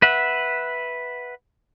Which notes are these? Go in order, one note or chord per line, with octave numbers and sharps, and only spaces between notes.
B4 E5 F#5